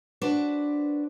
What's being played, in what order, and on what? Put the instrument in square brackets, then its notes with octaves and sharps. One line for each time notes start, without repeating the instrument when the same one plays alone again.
[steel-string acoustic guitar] D4 F#4 B4 C5